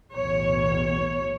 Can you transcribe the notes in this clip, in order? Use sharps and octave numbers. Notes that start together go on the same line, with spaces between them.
B1 E2 A2 C#5